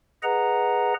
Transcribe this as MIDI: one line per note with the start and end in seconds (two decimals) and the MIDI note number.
0.23 0.94 68
0.23 0.94 71
0.23 0.94 75
0.23 0.94 78
0.23 0.94 82